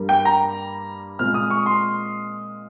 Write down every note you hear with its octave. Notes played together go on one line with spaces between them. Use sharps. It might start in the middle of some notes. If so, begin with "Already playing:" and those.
Already playing: G2 G3 A#3
G5
A#5
A#2 G#3 C4 F6
D#6
C#6
C6